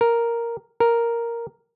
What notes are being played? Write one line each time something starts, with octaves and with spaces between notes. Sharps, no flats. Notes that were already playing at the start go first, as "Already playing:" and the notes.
A#4
A#4